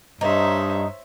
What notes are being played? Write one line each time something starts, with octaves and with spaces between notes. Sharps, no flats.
G2 D#4 C5 C#5 E5